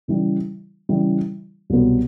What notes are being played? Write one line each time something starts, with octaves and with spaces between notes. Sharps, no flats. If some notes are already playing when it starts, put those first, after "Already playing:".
C#3 E3 G3
C#3 E3 G3
C2 B2 F#3 B3